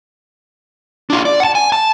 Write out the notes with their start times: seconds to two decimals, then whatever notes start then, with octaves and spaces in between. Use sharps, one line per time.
1.10 D4 F4
1.25 D5
1.40 F#5 A5
1.55 G#5
1.72 A5